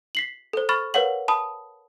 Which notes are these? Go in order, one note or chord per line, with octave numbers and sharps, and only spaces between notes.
B6 C7 F#7
A4 C5
B5 C#6 F6 A6
A#4 B4 C#5 F5 F#5 F#7
A5 B5 D#6